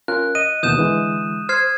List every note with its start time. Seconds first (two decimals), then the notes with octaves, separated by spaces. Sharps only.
0.08 C#4 F4 A#4 F#6
0.35 D#5 D#7
0.63 D#2 B2 E3 D#6 G6 E7
0.77 D3 E3 G#3
1.49 C5 F6 G#6 C7